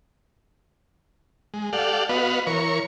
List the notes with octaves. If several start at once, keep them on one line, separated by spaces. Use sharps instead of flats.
G#3
G4 A4 D5 F5 F#5
B3 F#4 B4 D#5 F5
E3 A#4 C#5 C#6